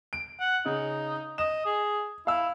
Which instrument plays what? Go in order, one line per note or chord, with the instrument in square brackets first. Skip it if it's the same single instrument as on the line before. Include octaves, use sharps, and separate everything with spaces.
[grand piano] D7
[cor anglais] F#5
[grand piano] C#3 [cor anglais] D#4
[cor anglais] D#5 [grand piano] E7
[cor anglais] G#4
[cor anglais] E4 [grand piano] F5 E6